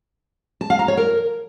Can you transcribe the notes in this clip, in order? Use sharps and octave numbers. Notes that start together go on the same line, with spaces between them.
A5
F5
A#5
C#5
A#4